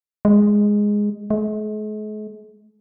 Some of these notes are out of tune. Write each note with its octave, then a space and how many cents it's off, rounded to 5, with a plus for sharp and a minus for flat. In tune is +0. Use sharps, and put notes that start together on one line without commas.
G#3 -5
G#3 +45